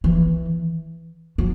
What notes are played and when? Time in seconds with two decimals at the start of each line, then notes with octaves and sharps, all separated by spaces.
0.04 E3
1.38 F#3